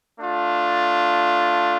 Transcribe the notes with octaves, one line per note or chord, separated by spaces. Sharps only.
A3 D4 F4